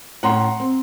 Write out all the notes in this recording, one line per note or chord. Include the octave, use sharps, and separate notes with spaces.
A2 C#4 C#5 F#5 A#5 C6
C4